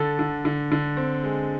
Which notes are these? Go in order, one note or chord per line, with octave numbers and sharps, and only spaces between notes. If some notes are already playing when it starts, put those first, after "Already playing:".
Already playing: D3 A4
D3
D3
D3
C4
G#3